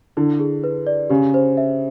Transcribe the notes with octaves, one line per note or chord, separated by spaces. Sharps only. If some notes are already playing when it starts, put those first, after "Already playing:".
D3 E4
G#4
B4
D5
C#3 G4
C5
E5